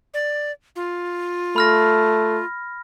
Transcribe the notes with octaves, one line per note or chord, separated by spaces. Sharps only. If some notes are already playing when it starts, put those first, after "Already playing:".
D5
F4
A3 B5 F6 A#6